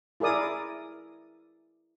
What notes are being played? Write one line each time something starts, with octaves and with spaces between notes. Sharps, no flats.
E4 G#4 A#4 D5 D#6